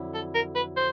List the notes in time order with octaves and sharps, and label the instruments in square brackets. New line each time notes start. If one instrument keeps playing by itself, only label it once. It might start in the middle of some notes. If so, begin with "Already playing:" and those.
Already playing: [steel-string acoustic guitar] F2 D3 F#3 E4
[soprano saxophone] A4
A#4
B4
C5